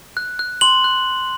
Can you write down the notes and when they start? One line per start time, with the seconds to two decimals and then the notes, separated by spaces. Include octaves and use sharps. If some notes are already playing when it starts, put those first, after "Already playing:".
0.17 F#6
0.39 F#6
0.61 C6 F#7
0.84 F#6